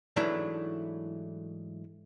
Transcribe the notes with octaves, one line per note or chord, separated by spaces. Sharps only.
G#2 E3 F#3 A3 D4 E4